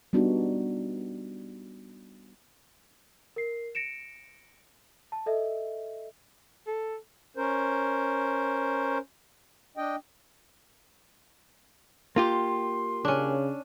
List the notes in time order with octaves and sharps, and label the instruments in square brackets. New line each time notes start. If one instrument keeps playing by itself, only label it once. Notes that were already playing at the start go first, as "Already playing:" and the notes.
[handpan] G3 B3 D4 D#4 F#4
[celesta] A#4 C7
A#6 C#7 D7 E7
A5
A4 D#5 E5
[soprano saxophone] A4
[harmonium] C#4 A#4 C5
D4 D#5 G5
[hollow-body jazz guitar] A#3 F4 G4 [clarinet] C6
[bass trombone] C#3 [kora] C#4 D4